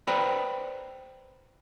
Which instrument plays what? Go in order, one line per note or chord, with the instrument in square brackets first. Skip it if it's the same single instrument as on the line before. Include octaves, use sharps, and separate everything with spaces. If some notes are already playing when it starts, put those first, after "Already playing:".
[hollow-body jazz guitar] B4 C5 D5 G5 A#5 B5